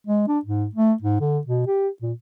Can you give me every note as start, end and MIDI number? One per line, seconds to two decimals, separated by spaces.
0.07 0.24 56
0.28 0.39 62
0.45 0.66 44
0.75 0.93 57
1.02 1.19 44
1.20 1.39 50
1.47 1.63 47
1.67 1.89 67
2.02 2.13 46